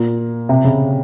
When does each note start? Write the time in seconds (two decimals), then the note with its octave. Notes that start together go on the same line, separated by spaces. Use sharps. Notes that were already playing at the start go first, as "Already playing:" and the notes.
Already playing: A#2
0.49 C3
0.64 C#3